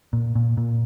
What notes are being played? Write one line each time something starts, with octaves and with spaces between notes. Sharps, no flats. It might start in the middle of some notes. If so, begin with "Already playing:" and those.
A#2
A#2
A#2